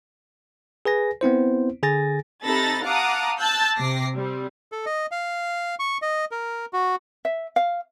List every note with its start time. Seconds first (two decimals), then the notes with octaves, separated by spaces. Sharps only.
0.85 G#4 B4 G#5 A#6
1.21 B3 C4 E4 C5
1.83 D3 G#4 G#5 A6 A#6
2.44 C3 D#4 A4 B5 A6 A#6
2.84 F5 F#5 A5 A#5 D6 D#6
3.40 A5 E6 F#6 G6 A6
3.77 C3 D6 A#6 C7
4.15 G3 C4
4.72 A4
4.86 D#5
5.11 F5
5.79 C#6
6.02 D#5
6.31 A#4
6.73 F#4
7.25 E5
7.56 F5